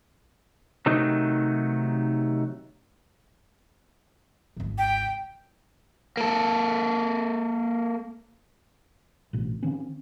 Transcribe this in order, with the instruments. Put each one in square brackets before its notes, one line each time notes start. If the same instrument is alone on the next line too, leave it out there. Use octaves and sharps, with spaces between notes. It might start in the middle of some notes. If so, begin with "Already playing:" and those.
[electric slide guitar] C3 D#3 F#3 A3 D#4
[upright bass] G#1 C#2
[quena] G5
[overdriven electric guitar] A#3 A4
[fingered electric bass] A1 B2
D#3 C4 C#4